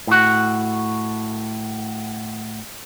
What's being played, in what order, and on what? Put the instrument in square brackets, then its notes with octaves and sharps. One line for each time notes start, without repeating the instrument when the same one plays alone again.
[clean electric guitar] A2 F#4